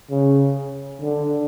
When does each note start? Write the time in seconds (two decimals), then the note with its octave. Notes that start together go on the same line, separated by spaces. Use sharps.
0.10 C#3
1.01 D3